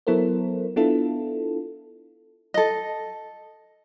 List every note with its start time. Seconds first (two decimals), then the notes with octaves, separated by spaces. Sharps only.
0.07 F#3 B3 E4 A4 A#4 C5
0.76 B3 D4 E4 F4 A4
2.54 A4 D#5